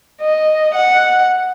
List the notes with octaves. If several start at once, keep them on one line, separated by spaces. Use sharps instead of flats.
D#5
F#5